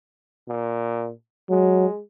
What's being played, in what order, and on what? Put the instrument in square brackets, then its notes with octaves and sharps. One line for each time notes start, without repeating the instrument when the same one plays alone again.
[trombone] A#2
[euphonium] F#3 [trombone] G#3